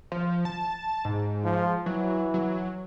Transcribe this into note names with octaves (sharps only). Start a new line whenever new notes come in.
F3
A5
G#2
F3
E3 F#3
F#3